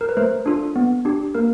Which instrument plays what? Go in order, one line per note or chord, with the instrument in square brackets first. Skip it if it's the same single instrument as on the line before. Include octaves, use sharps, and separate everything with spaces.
[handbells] A#4
B4
A3 A#4 C5
D4 F4 A4
B3
D4 G4
A#3 A#4